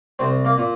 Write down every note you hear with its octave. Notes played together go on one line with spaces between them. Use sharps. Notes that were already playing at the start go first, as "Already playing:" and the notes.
C2 C4
A#3
A#2